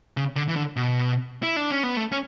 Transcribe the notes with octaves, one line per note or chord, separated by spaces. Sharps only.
C#3
D3
E3
D3
B2
E4
D4
C#4
B3
A3
C#4